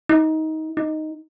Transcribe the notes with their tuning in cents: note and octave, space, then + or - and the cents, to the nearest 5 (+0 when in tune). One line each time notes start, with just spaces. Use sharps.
D#4 +20
D#4 +0